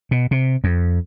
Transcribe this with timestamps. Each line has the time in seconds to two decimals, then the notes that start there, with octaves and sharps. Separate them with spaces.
0.11 B2
0.31 C3
0.64 F2